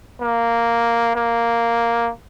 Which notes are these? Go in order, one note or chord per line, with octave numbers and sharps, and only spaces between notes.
A#3
A#3